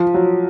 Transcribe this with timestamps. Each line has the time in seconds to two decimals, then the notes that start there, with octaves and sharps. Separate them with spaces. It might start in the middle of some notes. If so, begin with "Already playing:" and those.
Already playing: F3
0.14 F#3